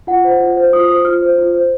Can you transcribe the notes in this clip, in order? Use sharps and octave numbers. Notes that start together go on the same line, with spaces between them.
F4 F#5
C5
F4
C5
F4 D#6
C5 D#6
F4 F6
C5
F4
C5